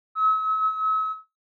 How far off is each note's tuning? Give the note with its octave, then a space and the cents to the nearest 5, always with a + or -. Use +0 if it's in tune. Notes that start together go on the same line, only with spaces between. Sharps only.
E6 -45